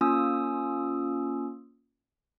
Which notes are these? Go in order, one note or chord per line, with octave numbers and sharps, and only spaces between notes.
A#3 C#4 F4 D#6 E6